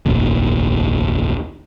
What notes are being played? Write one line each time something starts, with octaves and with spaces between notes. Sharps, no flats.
F1 A#1 D#2